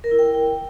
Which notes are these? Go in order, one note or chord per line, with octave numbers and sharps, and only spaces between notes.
A#4
E4
G5
A#4
G5